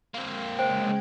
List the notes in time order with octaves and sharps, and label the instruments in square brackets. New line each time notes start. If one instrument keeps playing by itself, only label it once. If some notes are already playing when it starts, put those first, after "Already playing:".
[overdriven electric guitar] A#3 C4
[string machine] C#3 G#3 [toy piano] C5 [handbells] G5